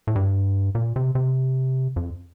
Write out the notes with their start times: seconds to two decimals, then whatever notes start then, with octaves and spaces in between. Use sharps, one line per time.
0.07 A2
0.16 G2
0.75 A#2
0.96 C3
1.15 C3
1.96 F2